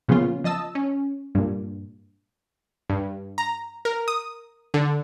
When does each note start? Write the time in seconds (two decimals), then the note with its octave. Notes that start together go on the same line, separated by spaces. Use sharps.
0.08 A#2 C#3 F3 B3 C#4 F4
0.44 F3 D#5 A5 E6
0.75 C#4
1.35 G2 A#2
2.90 G2
3.38 A#5
3.85 A#4
4.08 D#6
4.74 D3